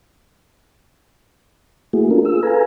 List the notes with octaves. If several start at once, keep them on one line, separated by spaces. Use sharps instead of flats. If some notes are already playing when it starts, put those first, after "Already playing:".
A3 A#3 E4 F#4 G#4
C#4 D4 F4 A4 A#4
F4 G#4 E6
A4 B4 F5 G#5 A#5